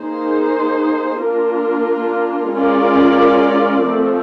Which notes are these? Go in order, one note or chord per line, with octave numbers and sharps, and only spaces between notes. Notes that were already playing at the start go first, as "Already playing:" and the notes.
Already playing: A#3 D#4 G#4 C5
A#3 D4 F4 A#4
G#3 C#4 F4 A#4 D5
F3 A3 C4